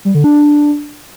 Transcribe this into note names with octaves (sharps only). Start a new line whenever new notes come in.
G3
D3
D4